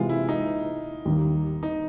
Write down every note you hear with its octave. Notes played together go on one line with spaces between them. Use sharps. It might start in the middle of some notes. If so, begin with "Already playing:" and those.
Already playing: C3 E3 G#3 F4
E4
D#4
D#2 D#3 G3 A#3
D#4